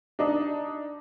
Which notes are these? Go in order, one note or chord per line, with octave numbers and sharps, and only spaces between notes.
D4 D#4